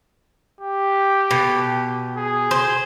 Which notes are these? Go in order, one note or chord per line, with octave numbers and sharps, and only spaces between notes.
G4
B2
G#4
C5